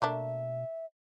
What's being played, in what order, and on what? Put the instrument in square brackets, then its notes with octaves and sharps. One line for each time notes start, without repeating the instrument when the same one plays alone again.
[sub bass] B2 [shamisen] A3 A#3 D4 [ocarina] E5